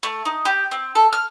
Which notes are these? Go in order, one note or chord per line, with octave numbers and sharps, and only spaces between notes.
A3
D#4
G4
C4
A4
F6